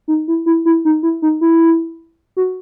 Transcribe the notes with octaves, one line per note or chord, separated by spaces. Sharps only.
D#4
E4
E4
E4
D#4
E4
D#4
E4
F#4